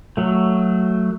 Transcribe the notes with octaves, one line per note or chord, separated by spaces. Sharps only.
F#3 A3